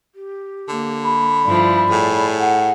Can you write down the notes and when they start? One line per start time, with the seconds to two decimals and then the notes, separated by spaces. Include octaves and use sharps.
0.15 G4
0.69 D3 A#3
1.04 B5
1.44 G2 F3 E4 D5
1.91 A2 G#4
2.38 F#5